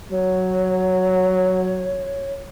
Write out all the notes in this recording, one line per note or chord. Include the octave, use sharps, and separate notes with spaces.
F#3 C#5